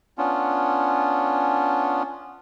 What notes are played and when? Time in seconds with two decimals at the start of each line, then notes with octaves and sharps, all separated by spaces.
0.18 B3 C#4 D4 F4